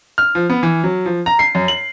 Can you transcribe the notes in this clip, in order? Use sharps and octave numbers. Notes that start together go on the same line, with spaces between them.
F6
F3
B3
E3
F#3
F3
A#5
C7
F#2
F#7